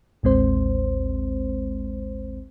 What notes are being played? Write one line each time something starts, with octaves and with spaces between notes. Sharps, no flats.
A1 D#2 G#3 C4 C5